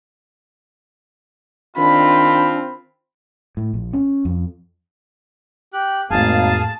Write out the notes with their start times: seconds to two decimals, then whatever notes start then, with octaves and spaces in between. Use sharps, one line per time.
1.77 D#3 C4 D4 F4 B5
3.57 A2
3.74 A#1
3.93 C#4
4.25 F2
5.73 G4 F#6
6.10 G#1 F2 A2 A#3 G#4 F5 G#5 A5